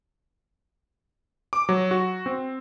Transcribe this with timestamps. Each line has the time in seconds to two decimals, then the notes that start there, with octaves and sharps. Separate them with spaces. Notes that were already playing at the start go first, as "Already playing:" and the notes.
1.53 D6
1.69 F#3
1.91 F#4
2.26 C4